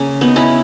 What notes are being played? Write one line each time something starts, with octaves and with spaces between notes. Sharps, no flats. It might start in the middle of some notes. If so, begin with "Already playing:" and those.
Already playing: C#3 A#3 C#4
B3 D#4
C#4 E4